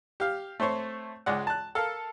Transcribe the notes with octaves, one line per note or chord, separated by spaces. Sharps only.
G4 F5
A3 C4 C5 C#5
C#2 G#3 D5 F#5
A5 F#6
A4 A#4 F5